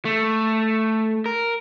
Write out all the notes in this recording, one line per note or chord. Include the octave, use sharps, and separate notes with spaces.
A3
A#4